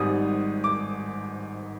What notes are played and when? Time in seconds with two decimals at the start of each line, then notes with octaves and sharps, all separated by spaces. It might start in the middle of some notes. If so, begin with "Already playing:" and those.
Already playing: G#1 G#2 G3 D#6
0.64 D6